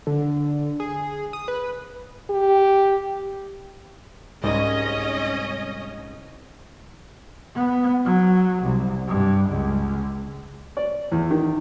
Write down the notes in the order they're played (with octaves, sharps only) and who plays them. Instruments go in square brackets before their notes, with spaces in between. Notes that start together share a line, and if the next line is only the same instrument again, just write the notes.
[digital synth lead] D3
G#4
D#6
B4
[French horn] G4
[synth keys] C2 G#2 [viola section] C#4 D#5
[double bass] B3
F#3
C2
G2
C#2
[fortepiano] D5
E2
D#3